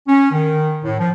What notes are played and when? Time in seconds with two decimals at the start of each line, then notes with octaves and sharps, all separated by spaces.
0.08 C#4
0.32 D#3
0.83 A2
0.99 F3